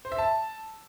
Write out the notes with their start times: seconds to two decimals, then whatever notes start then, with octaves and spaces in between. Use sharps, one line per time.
0.05 C5
0.12 E5
0.18 A5